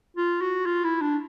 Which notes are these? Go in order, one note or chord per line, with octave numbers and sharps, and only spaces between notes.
F4
F#4
F4
E4
D4